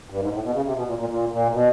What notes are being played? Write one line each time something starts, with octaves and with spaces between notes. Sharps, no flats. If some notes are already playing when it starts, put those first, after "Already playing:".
G2
G#2
A2
B2
C#3
C3
B2
A#2
A#2
A#2
A#2
B2